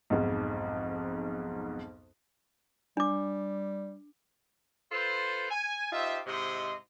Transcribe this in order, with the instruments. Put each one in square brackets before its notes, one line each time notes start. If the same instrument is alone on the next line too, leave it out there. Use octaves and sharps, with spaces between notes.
[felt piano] B1 F2 G#2
[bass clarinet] G3 [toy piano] D4 D6
[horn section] F4 A4 B4 C5
G#5
D#4 F4 G4 C5 E5
G#2 C3 E4 D#5 C6